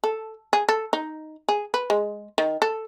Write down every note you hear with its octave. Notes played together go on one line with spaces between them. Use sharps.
A4
G#4
A4
D#4
G#4
B4
G#3
D#3
A4